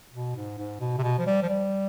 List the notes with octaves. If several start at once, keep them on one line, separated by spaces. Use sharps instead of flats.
B2
G#2
G#2
B2
C3
B2
F3
G3
F3
G3